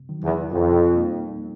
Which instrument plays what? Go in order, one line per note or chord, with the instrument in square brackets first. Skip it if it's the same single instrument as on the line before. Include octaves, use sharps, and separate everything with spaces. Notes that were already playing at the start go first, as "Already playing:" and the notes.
Already playing: [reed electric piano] C3
D#3 F#3
[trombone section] E2
[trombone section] F2 [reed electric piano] B2
[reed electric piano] G3 A#3 D#4